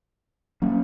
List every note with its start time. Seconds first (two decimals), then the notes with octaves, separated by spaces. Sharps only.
0.62 F#3 A#3 C#4